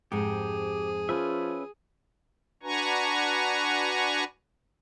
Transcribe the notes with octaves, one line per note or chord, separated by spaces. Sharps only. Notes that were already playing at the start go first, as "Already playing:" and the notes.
F2 G#2 G4 G#4
F3 C#4 B4 E5
D4 F#4 B4 G#5 A#5 C#6